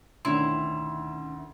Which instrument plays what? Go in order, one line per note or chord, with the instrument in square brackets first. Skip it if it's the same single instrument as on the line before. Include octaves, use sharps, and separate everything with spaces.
[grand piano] D2 D#3 F7 [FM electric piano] B2 C#4 D4 [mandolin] E4 [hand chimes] C6